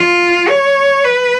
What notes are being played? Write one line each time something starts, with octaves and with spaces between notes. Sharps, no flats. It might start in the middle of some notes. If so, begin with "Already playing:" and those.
Already playing: F4
C#5
B4